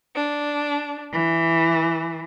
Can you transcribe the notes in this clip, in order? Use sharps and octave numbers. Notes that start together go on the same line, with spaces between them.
D4
E3